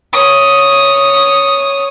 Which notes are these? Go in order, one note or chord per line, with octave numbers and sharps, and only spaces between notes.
C#5 D#6